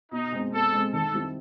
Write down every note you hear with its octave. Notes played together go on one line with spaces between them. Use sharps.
B2 D#4
G#3 C4
B2 A4
G#3 C4
D#3 A4
G3 C4 E4 G4